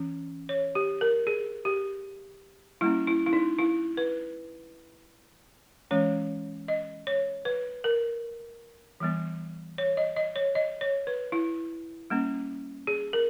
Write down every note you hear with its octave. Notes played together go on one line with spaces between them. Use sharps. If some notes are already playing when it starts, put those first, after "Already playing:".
Already playing: E3 C#4
C#5
G4
A#4
G#4
G4
G3 A#3 C#4 E4
E4
E4
D#4
E4
B4
E3 G#3 C#4 C#5
D#5
C#5
B4
A#4
E3 G3 B3
C#5
D#5
D#5
C#5
D#5
C#5
B4
E4
G3 A#3 C#4
G#4
A#4